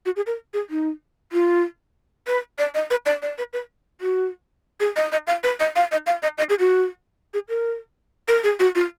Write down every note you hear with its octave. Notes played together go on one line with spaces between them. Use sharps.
F#4
G#4
A#4
G#4
D#4
F4
B4
D5
D#5
B4
D5
D5
B4
B4
F#4
G#4
D#5
D#5
F5
B4
D#5
F5
D#5
F5
D#5
D#5
G#4
F#4
G#4
A#4
A#4
G#4
F#4
F4